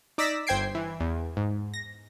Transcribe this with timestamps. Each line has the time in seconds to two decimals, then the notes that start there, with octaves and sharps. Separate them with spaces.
0.18 D#4 D5 E6 A#6 B6
0.47 G1 C5 G5 G#6 C7 D7
0.75 E3
1.00 E2
1.37 G#2
1.74 A#6